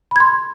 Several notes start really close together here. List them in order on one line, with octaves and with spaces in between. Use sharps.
B5 G#6 C6